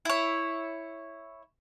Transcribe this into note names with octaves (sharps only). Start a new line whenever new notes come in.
E4 C#5